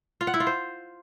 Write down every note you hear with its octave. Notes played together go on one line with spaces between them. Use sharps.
F4
F#5
E4
F4
C5